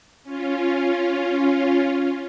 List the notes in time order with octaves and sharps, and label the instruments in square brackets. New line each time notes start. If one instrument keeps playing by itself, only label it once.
[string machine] C#4 F4